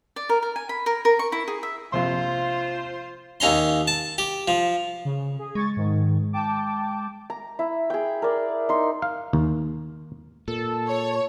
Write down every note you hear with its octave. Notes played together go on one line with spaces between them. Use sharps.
D5
A#4
A#4
G#5
B5
A#4
A#4
C#6
E4
G#4
E5
A#1 C3 F4 C5 C6
D#2 C#4 A#5 C6
A5
G4
F3
C#3
G#4
G#3 C#6 G#6 A6
G#2 D#3
G5 A5 D6
A#5
E4
G#4 G5
A#4 D5
D#4 C6
F5
D#2
A#2 A4
C#5